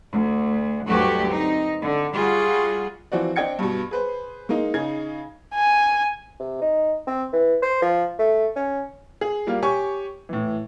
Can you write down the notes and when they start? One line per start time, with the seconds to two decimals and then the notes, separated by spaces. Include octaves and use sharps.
0.12 D2
0.87 D2 G2 F#3 A3 F#4 G4
1.28 C4 D#4
1.81 D3
2.14 G3 F4 F#4 G#4
3.12 E3 F3 C4 F#4 D5
3.36 C4 D4 D#5 G5 G#6 C#7
3.59 G2 B2
3.91 G#4 B4 C5
4.49 G#3 A#3 D#4
4.74 C#3 D#4 G#4 G#6
5.54 G#5
6.40 C3
6.62 D#4
7.07 C4
7.33 E3
7.62 C5
7.82 F3
8.19 A3
8.56 C#4
9.21 G#4
9.47 G3 A#3 F4
9.62 G4 C#5 G#5 C#6
10.29 A2 E3